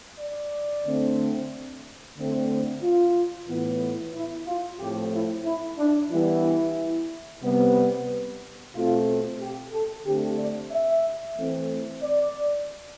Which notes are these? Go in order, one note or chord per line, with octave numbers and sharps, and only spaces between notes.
D5
D3 A3 C4
D3 A3 C4
F4
A2 E3 B3
E4
F4
A2 F3 A3 C4 G4
E4
E4
D4
E3 G3 B3 E4
C3 G3 B3
B2 A3 C4 F4
G4
A4
D3 A3 C4 G4
D5
E5
E3 A3 C4
D5